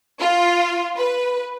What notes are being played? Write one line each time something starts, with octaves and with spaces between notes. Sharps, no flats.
F4
B4